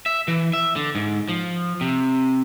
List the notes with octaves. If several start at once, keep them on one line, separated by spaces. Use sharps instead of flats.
E5
E3
E5
D3
G#2
F3
C3